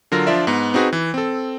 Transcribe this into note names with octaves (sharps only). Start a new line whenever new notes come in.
D3 F#3 F4 A#4 A#6
F3 D4 F4 D5 E5
G#2 B3
C4 D#4 F#4 G#4 B4
E3
C4 A4